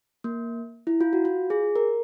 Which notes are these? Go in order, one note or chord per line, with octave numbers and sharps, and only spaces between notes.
A#3
E4
F4
F#4
F4
G#4
A#4